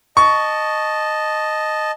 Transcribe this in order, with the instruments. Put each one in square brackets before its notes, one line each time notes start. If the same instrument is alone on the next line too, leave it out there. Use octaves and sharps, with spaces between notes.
[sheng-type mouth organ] D#5 A5 [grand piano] C#6